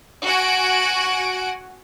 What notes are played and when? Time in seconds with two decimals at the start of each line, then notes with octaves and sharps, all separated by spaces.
0.24 F#4 F#5 G#5 D7